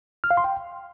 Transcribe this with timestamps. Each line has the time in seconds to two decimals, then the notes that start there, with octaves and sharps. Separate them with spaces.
0.24 F6
0.31 F5
0.37 C6
0.44 G5